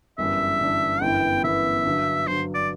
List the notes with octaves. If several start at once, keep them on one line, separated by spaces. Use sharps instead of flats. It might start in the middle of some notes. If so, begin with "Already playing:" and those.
G1 F#2 E3 G3 D4 E5
G1 F#2 E3 G3 D4
G1 F#2 E3 B3 E4 G5
G1 F#2 E3 B3 E4 E5
G2 D3 F#3
G2 D3 F#3 C5
D5